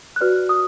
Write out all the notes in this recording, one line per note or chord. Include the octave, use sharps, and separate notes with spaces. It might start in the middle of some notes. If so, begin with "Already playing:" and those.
F#6
F#4 B4 D5 F6
D#6